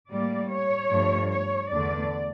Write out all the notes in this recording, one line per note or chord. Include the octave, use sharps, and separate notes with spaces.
A2 G3 A#3 D5
C#5
G2 F3 A3
C#5
E2 D3 A3 D5